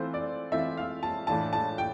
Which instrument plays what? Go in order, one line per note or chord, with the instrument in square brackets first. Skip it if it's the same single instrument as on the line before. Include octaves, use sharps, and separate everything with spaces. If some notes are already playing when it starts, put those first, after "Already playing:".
Already playing: [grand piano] E3 A3 C4 F4 [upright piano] C5
[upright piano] D5
[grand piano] E3 A3 C4 F4 [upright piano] E5
[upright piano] F5
A5
[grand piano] A2 E3 A3 D4 F4 [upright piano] A5
[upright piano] A5
G5